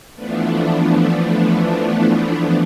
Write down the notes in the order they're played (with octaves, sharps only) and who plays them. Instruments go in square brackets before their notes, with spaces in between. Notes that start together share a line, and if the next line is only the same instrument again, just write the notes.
[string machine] E3 F3 A3 B3 D4